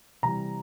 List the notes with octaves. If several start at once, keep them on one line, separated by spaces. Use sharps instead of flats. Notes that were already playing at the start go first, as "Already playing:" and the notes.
C3 E3 G3 A#5